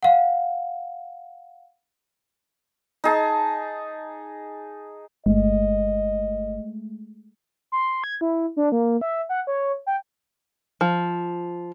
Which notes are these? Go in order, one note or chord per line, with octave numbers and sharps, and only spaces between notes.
F5 F#5
D#4 G#4 A5
G1 G#3 A3 D#5
C6
G#6
E4
D4
A#3
E5
F#5
C#5
G5
F3